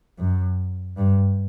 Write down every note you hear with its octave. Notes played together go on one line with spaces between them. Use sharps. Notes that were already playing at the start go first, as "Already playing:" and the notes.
F#2
G2